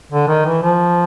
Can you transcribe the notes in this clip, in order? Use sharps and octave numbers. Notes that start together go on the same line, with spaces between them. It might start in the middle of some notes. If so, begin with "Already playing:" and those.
D3
D#3
E3
F3